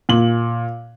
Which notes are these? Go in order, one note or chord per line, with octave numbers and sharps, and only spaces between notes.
A#2 F#7